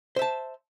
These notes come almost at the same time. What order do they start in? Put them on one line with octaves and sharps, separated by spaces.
C5 E5 A5